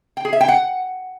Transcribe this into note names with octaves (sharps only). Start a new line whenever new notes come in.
G5
G#4
E5
G5
F#5